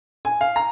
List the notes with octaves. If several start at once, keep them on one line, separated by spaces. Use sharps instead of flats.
G#5
F5
A#5